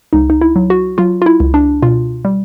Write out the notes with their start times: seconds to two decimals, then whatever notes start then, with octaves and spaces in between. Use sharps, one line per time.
0.13 C#2 D#4
0.30 D#4
0.41 E4
0.56 F#3
0.70 F#4
0.98 F#3 F4
1.22 F4
1.26 E4
1.40 C#2
1.54 D4
1.82 B2 F4
2.25 G3